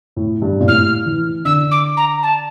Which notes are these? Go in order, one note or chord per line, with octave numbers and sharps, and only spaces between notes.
A2
G2
A#2
A2 F6
E3
D3 E6
D6
A#5
A5